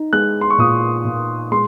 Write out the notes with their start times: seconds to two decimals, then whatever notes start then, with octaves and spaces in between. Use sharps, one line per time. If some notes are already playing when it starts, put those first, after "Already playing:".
Already playing: D#4
0.13 G#3 F#6
0.41 C6
0.50 C#6
0.58 A#2 D#6
1.05 A#2
1.52 G#3 C6